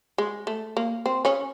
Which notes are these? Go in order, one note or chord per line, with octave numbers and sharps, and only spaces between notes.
G#3
A3
A#3
C4
C#3 C#4